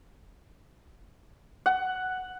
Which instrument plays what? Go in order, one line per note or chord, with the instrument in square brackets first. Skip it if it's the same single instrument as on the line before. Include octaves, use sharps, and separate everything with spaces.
[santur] F#5